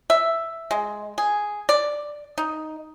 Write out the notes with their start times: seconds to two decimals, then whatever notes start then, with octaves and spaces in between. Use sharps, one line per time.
0.10 E5
0.71 G#3
1.18 G#4
1.69 D5
2.38 D#4